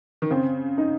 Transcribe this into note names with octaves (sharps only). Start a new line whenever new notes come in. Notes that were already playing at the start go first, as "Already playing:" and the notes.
D#3
C#3 C4
D#4